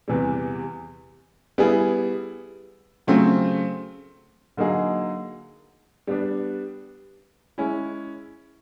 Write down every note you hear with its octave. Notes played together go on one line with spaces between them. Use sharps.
E2 C3 E3 G3
G3 B3 E4 G#4
C#3 F#3 A3 C4 F4
D3 F#3 A#3 D#4 G#4
G3 B3 D4
G#3 C#4 E4